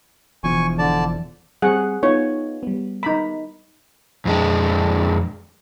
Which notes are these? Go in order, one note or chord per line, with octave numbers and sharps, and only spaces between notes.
E1 E2 F3 G#5 C#6
D3 D5 A5
G3 C4 G#4 F#5
B3 D#4 F4 C#5
G3 B3
D#4 A#5 B5
F2 G#3 D4